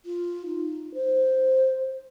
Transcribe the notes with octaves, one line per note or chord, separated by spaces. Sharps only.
F4
D#4
C5